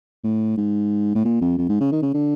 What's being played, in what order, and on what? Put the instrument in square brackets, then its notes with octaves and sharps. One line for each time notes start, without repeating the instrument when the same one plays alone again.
[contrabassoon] A2
G#2
A2
A#2
F2
F2
G#2
C#3
D#3
C#3
D3